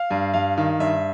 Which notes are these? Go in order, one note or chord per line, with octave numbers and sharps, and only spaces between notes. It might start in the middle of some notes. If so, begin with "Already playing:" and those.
Already playing: F5
G2
G2 F5
D#3
G2 E5